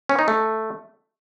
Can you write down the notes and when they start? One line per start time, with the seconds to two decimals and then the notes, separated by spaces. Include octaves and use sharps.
0.09 C#4
0.19 D#4
0.28 A3